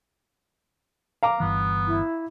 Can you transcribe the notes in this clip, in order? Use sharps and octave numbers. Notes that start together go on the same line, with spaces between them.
F5 A#5 D6
G1 G2 E3 B3
E4